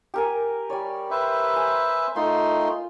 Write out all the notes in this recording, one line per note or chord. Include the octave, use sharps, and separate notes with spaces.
G4 A#4 G#5
G3 C#5 D5
B4 C5 E5
G#5
A3 D#4 F4 C6